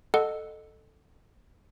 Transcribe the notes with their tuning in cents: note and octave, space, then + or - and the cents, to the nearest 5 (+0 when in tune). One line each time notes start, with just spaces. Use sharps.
A4 +0 D#5 -20 F#5 +0